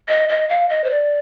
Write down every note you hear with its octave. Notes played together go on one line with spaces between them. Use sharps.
D#5
D#5
F5
D#5
C5
D5